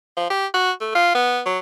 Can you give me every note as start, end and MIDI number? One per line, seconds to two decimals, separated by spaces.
0.17 0.26 53
0.30 0.46 67
0.54 0.71 66
0.80 0.93 57
0.95 1.13 65
1.14 1.41 59
1.46 1.58 54